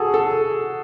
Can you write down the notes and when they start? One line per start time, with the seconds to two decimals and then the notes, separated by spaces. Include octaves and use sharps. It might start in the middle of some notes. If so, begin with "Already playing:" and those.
Already playing: F#4 G#4 A4
0.14 A4